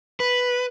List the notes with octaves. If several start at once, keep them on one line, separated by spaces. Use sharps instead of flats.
B4